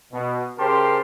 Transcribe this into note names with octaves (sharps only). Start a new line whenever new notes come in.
B2
C#3 G4 A#4 C5 A5 C6